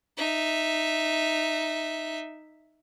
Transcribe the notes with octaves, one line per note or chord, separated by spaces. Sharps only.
D#4 E5